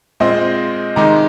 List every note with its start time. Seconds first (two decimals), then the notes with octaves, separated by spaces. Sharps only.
0.20 A#2 G#3 C4 F4 C5 D#5
0.96 C3 D#3 G#3 D#4 A#5 D6